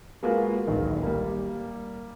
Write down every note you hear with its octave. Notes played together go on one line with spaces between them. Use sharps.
G#3 A#3 F4 F#4 G#4 B4
D1 A#1 D#3
G3 A#3